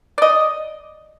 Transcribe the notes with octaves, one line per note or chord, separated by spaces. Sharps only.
D5 D#5